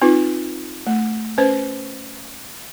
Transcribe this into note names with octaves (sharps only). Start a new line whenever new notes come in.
C4 D#4 F4 B4
A3
C#4 B4 C5